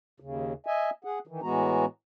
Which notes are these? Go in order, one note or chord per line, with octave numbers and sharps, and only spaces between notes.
D#2 C#3
D#5 E5 G#5
G#4 F#5
D#3 E3
A2 E3 G#3 B3 F#4 A#5